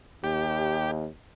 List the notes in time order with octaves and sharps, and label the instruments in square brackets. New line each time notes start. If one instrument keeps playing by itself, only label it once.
[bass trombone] D#2 [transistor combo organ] G4